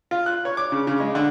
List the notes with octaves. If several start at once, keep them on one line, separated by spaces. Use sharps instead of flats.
F4
F#6
C#5
D6
C#3
C#3
G#3
D3